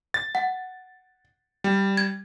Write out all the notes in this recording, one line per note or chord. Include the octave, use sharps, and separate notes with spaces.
A6
F#5
G3
G#6